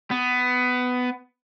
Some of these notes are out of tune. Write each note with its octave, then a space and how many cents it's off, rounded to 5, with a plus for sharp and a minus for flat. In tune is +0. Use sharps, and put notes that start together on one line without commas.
B3 +15